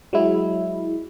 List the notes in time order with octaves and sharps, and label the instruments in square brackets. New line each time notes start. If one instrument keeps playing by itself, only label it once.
[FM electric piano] F#3 G#3 E4